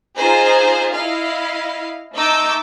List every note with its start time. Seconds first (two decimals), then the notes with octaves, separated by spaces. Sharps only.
0.17 D#4 F4 G#4 C5
0.94 E4 D#5 F5
2.15 A3 D#4 D6 E6 G6